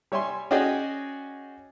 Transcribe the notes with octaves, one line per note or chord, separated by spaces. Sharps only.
G3 C#5 E5 G#5 C6
C#4 F#4 G#4 D5 D#5 G5